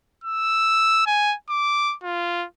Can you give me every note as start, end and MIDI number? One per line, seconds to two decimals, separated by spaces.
0.24 1.04 88
1.07 1.35 80
1.50 1.95 86
2.03 2.46 65